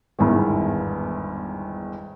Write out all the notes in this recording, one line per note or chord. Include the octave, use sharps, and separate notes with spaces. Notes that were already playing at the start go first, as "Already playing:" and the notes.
G1 E2 G#2 D#3